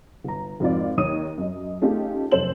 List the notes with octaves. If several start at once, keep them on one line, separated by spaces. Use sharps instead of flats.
G1 A#5
G#1 F2 D#4 F4 D5
D#2 D#4 C#5 D#6 D#7
F#2 D#5
A3 C#4 D#4 F4 G4 G#4
F1 F#2 A4 C5 E7 F#7